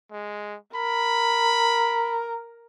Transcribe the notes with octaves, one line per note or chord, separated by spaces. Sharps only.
G#3
A#4 B5